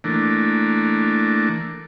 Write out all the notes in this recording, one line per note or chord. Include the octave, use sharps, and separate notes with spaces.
E3 A3 A#3 D4